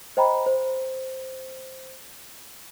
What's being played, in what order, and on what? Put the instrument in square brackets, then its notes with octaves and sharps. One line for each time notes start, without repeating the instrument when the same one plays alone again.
[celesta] C5 D#5 G5 A#5 B5
C5